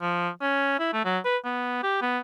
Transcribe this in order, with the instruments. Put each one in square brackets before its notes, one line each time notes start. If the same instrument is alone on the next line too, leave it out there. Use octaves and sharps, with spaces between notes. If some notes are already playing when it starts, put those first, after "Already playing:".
[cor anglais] F3
C#4
E4
A3
F#3
B4
B3
G4
B3